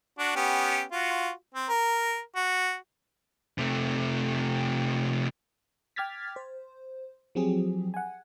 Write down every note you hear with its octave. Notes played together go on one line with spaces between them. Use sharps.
D4 F#4
B3 C#4 G4
F4 F#4
C4
A#4
F#4
C3 A3
G5 D6 F6 G#6 A6 B6
C5
F3 F#3 C4 G4 G#4
F#5 G#5